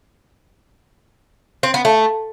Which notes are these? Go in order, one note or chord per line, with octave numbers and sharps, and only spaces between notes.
C4
B3
A3